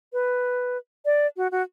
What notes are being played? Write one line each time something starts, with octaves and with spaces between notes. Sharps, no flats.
B4
D5
F#4
F#4